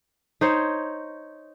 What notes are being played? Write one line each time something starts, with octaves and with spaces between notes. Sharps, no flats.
D#4 C5 C#5